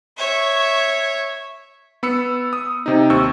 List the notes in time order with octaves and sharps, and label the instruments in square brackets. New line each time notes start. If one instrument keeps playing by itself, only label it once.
[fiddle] C#5 E5
[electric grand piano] B3 B5 E6 C#7
D#6
C3 D#4
D#2 C4 C#6 E6